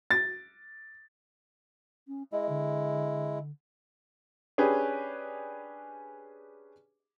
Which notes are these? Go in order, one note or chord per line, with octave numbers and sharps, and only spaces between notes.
A6
C#4
G#3 E4 D#5
D3
C#4 D4 G4 G#4 B4